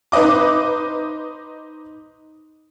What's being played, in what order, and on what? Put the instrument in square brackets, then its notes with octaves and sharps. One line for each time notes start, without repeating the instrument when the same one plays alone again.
[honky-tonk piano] D#4 B4 C5 D#5 D6